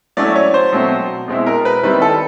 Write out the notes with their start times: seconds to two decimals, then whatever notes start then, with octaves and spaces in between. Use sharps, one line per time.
0.17 F#3 A3 C#4 E4 D5
0.36 C#5
0.54 C5
0.72 B2 F#3 A3 C4
1.28 B2 G#3 C4 E4
1.47 A#4
1.65 B4
1.83 D#3 G3 C4 E4 B4
2.02 A4